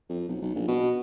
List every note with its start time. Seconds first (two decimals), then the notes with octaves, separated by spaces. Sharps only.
0.09 F2
0.28 B1
0.42 B1
0.55 A#1
0.68 B2